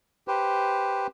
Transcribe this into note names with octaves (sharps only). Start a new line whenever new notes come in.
G4 B4 C5